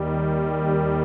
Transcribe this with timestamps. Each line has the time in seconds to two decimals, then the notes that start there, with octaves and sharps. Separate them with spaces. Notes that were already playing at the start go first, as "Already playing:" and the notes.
Already playing: D#2 D#3 G3
0.64 D#4